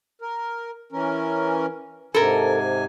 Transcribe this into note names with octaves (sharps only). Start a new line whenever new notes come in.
A#4
E3 C#4 A#4
G#2 C3 A4 A#4 G#5